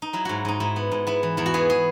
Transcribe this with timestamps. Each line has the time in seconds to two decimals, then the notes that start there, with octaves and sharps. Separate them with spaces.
0.02 D#4
0.13 F#3 E4
0.25 G#2 F#4
0.45 G#2 D#4
0.60 G#2 E4
0.76 B3
0.92 G#2
1.07 B3 E4
1.23 E3
1.37 E2 E4
1.46 F#4
1.54 B3 G#4
1.70 G#4